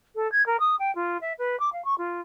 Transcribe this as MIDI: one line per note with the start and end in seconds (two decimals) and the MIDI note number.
0.15 0.30 69
0.32 0.44 92
0.46 0.57 70
0.60 0.76 87
0.79 0.93 79
0.95 1.18 65
1.21 1.33 76
1.39 1.59 71
1.60 1.70 86
1.73 1.84 77
1.85 1.95 85
1.98 2.21 65